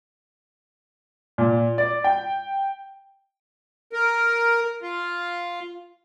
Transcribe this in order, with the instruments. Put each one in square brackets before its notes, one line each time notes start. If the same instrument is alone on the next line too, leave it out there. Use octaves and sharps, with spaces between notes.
[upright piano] A#2
D5
G5
[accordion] A#4
F4